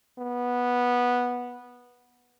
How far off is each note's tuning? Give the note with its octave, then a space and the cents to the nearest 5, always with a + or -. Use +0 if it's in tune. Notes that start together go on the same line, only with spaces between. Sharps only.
B3 -10